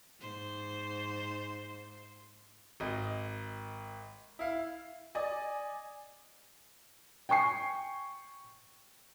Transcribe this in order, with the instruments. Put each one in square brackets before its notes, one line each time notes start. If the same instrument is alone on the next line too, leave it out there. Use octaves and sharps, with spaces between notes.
[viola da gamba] G#2 C5
[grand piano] G#1 D#5
E4 F5
[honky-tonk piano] D5 D#5 G#5
[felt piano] G5 G#5 C#6 C7